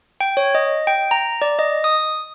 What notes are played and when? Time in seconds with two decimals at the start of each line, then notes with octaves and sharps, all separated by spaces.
0.21 G5
0.37 C#5
0.55 D#5
0.87 G5
1.11 A#5
1.42 D5
1.59 D#5
1.84 D#6